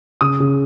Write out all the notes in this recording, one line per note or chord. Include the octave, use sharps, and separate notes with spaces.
C#3 D#6
C#3